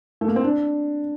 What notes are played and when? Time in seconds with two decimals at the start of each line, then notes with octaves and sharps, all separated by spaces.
0.21 A3
0.28 A#3
0.36 C4
0.44 D4